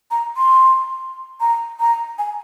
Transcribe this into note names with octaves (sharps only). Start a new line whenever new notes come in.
A#5
C6
A#5
A#5
G#5